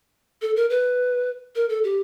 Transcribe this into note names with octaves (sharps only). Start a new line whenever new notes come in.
A4
A#4
B4
A#4
A4
G4